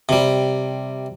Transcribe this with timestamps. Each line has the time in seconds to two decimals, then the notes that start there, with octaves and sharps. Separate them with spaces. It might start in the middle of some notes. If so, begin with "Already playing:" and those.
0.09 C3 G3